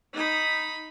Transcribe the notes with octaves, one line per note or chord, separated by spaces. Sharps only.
D#4 B5